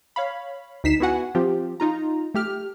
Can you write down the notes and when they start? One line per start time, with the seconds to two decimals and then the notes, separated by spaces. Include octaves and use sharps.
0.16 C#5 F5 B5
0.84 D2 D#4 B6 C7 E7
1.00 B3 E4 F#4 F#5 G#5
1.35 F3 C4 F4 G4
1.80 D#4 F4 A#5
2.34 A3 G4 F6